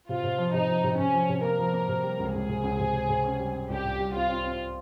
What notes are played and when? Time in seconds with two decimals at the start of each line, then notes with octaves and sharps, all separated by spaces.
0.09 C3 F4
0.23 C3
0.38 F3
0.53 C3 D#4
0.69 F3
0.84 C3
0.98 C3 C#4
1.14 F3
1.29 C3
1.44 A#3 A#4
1.59 F3
1.74 A#3
1.88 C3
2.03 G3
2.19 C#2
2.34 C#2 G#4
2.49 C3
2.64 C#2
2.80 C3
2.93 C3
3.09 C3
3.24 C#4
3.39 G3
3.54 C#4
3.70 C2 G4
3.84 A#2
4.00 G3
4.14 C4 F4
4.29 C4
4.44 C4